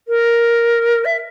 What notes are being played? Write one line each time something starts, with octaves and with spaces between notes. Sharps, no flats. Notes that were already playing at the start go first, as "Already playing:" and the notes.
A#4
E5